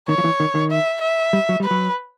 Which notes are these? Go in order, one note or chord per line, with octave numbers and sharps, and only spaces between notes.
D#3 C#5
F3
E3
D#3
D#3
E5
E5
G3
F#3
G3 B4
F#3